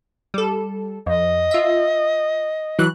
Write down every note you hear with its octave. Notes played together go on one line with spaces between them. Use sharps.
G3 A4
F2 D#5
F4 E5
E3 F#3 F#6